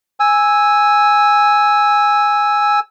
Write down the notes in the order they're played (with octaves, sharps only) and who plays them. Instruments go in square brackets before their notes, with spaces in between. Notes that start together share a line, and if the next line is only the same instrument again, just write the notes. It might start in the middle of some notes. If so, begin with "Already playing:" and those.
[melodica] G#5 E6